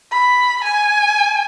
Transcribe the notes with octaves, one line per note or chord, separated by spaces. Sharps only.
B5
G#5